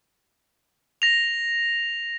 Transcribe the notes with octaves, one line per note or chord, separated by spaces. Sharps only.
A#6 F7